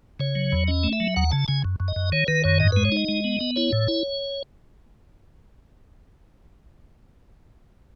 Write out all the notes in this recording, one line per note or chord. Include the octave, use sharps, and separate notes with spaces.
C#3 C#5
F#3
E2
C#4 D#5
A3
E5
F#3
D#2 F#5
C#3 A5
C#3 G#5
F#2
F#2
D#5
F#2
D#3 C#5
D#3 B4
F#2 C#5
G#2 D#5
G#3 B4
C#5
D#4 D#5
G#3
B3
B3
E4 C#5
A2
E4